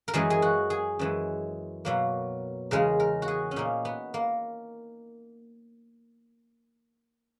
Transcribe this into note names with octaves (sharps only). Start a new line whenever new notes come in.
A#4
F#2 E3 G#3 G#4
G#4
F#4
G#4
F#2 E3 G#3
B2 F#3 A#3
E2 C#3 G#3 A#4
A#4
F#4
G#4
C#4
A#2 A#3 D#4
B3
A#3